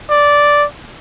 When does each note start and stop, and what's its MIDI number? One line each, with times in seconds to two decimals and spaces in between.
0.11 0.65 74